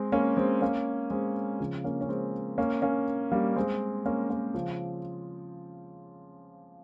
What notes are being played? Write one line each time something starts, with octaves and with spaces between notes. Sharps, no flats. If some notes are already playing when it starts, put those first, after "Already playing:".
Already playing: G#3 C4
A#3 C#4
G#3 C4
A#3 C#4
G#3 C4
C#3 F3
A#3 C#4
C#4
G#3 C4
A#3 C#4
A#3 C#4
G3 A#3
G#3 C4
A#3 C#4
A#3 C#4
C#3 F3